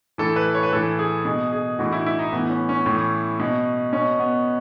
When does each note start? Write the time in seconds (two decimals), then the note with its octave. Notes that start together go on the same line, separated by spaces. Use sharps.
0.18 A2 E3 A4
0.36 B4
0.54 C#5
0.63 B4
0.73 A2 E3 A4
0.99 G#4
1.25 B2 G#4
1.53 G#4
1.79 A2 E3 F#4
1.93 E4
2.06 E4
2.19 D#4
2.32 A2 E3 B3
2.50 C#4
2.69 C#4
2.86 A2 E3
3.40 B2
3.93 B2 C#4
4.20 B3